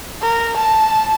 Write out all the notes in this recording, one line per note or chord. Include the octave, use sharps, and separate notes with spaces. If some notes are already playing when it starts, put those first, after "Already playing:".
A#4
A5